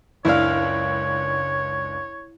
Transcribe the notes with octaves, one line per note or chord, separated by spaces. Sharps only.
F#1 C#2 D4 E4 C#5 F5